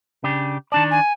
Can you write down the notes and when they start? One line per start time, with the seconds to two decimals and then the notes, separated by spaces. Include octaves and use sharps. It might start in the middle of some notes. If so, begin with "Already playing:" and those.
0.24 C#3 D4 G4
0.72 D#3 D4 D5 A5
0.91 G#5